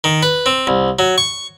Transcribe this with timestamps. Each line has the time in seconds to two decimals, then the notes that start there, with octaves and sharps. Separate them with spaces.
0.04 D#3
0.23 B4
0.46 C4
0.67 C2
0.99 F#3
1.18 C#6